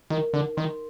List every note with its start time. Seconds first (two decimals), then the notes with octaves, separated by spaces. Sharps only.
0.10 D#3 A#4
0.34 D3 D#4
0.57 D#3 C6